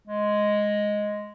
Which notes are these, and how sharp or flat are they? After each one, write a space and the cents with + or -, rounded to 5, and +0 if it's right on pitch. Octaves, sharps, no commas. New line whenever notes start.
G#3 +0